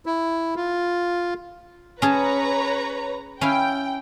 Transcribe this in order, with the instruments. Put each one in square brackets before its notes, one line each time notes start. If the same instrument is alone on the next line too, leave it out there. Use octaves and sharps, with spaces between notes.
[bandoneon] E4
F4
[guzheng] C#4 G#4 A5 [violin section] B4 C#5 A#5
[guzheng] C#4 E4 F5 [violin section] G5